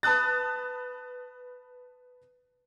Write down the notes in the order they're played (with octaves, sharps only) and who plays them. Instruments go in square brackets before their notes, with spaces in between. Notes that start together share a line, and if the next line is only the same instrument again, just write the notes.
[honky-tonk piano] B4 A5 D#6 F#6 A6